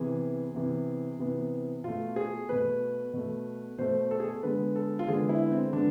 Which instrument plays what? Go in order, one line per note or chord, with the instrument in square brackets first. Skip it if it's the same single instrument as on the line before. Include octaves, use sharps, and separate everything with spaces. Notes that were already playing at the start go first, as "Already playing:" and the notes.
Already playing: [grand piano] C3 E3 B3 G#4
C3 E3 B3
C3 E3 B3
B2 A3 F4
G#4
B2 A3 B4
B2 A3
B2 A3 C5
A4
G#4
A4
D3 G#3 B3 B4
A4
F4
D3 G#3 B3 G#4
E4
C4
D3 G#3 B3 D4